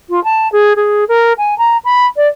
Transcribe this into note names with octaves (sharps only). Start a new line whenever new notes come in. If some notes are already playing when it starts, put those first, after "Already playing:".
F4
A5
G#4
G#4
A#4
G#5
A#5
B5
D5